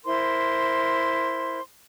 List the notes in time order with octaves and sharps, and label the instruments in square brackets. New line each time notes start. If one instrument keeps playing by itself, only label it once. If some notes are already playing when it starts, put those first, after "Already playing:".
[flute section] E4 A#4 C5 C6